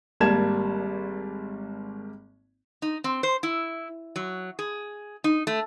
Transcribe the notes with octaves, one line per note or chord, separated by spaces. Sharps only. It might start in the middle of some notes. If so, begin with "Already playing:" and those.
G#1 G3 A#3 A5 G#6 E7
D#4
C4
C5
E4
F#3
G#4
D#4
A3